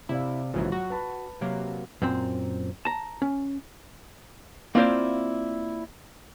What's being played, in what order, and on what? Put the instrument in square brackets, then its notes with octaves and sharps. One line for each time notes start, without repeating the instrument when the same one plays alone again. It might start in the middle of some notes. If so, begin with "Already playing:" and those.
[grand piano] C3 D5 F5 [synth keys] E4
[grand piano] A#1 G#2 F#4 [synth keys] C#3 E3 F#3
[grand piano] F#3 [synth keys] F#4
[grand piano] B4 A5 B5
[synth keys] C3 F#3 A#3
[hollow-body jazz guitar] F#2 A#2 C4
A5 A#5
C#4
A#3 C4 E4 F4 C5 D5